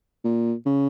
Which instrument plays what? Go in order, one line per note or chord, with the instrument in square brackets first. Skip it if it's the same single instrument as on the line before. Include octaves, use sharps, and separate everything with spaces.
[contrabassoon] A#2
C#3